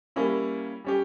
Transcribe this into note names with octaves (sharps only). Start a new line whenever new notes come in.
G3 A#3 C#4 E4
G3 C#4 G4